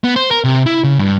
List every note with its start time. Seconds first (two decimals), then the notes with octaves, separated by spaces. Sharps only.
0.04 B3
0.16 C5
0.31 A#4
0.44 C3
0.66 E4
0.84 C#3
0.99 G2